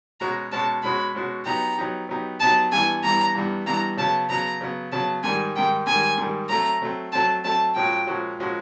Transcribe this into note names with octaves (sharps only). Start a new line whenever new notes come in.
B2 G#3 C#4 F#4 A#5
B2 G#3 C#4 F#4 A5
B2 G#3 C#4 F#4 B5
B2 G#3 C#4 F#4
F#3 B3 D#4 G4 A#5
F#3 B3 D#4 G4
F#3 B3 D#4 G4
F#3 B3 D#4 G4 A5
G2 E3 G3 B3 G#5
G2 E3 G3 B3 A#5
G2 E3 G3 B3
G2 E3 G3 B3 A#5
C#3 F#3 B3 A5
C#3 F#3 B3 A#5
C#3 F#3 B3
C#3 F#3 B3 A5
G#2 D#3 G3 G#5
G#2 D#3 G3 G5
G#2 D#3 G3 G#5
G#2 D#3 G3
F#3 A3 C4 A#5
F#3 A3 C4
F#3 A3 C4 A5
F#3 A3 C4 A5
A#2 F3 G#3 C#4 F#4 G5
A#2 F3 G#3 C#4 F#4
A#2 F3 G#3 C#4 F#4